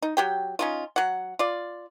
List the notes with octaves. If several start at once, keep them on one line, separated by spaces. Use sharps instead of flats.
D#4
F#3 G4 G5
C#4 D#4 F4
F#3 F#5
F4 D5